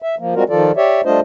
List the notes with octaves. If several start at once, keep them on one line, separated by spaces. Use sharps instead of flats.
E5
F3 A#3
G3 G#3 C4 F4 F#4 A#4
D#3 F3 F4 A4 D5
G4 C#5 D5 E5
G3 A3 D4 F4 C5 D#5